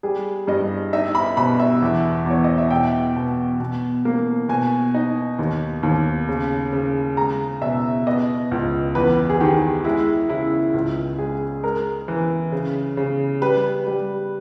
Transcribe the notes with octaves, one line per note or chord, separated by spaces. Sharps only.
G3 G#4
G2 D#5
D#4 E5
B5
B2 B5
E5
E2
E2 C#5
D#5
E5
B2 G5
B2
B2
A#3
B2 G#5
D#4
D#2
D#2
C#3
C#3
G#3 A#5
B2 E5
B3 D#5
C#2
E2 B4
G#4
D#3 G4
G#3 E4
C#3 E4
C#2
G#3 G#4
G#3 A#4
E3
C#3
C#3
G3 B4
G3